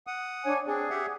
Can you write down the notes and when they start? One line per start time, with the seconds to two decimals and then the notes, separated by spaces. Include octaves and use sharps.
0.07 F#5 D#6
0.45 D4 C#5 G#5
0.66 C4 D4 G#4
0.90 G4 E5 F#5